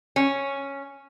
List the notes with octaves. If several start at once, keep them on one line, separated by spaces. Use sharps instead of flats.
C#4